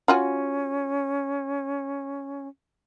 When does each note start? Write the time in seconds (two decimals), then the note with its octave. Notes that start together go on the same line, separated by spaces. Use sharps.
0.08 C#4 F4 F#4 G#5